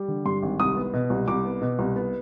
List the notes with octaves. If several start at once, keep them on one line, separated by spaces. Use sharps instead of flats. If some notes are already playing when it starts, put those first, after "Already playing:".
Already playing: G3
D3
G2 C6
G#1
C2 D#6
B3
B2
C2
C2 D6
B3
B2
C2
B3